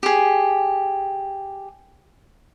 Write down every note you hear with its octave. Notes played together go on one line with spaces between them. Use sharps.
G4 G#4